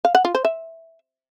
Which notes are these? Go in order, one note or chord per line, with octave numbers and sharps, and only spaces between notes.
F5
F#5
F4
C5
E5